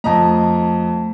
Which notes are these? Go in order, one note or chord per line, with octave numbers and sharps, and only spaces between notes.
F2 A3 D#5 A5 A#5